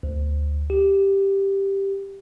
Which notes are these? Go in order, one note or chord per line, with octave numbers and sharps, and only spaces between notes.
D2
G4